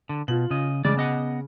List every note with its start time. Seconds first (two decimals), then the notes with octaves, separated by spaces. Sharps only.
0.09 D3
0.28 B2 F4 F#7
0.51 C#3 D#5
0.85 C#3 G#3 D5 D6
0.97 B3 D#5 F#5